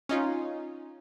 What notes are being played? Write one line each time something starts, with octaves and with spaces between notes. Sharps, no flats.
C#4 D#4 F4